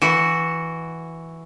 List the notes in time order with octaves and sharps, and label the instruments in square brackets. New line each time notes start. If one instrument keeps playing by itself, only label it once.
[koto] E3 F#4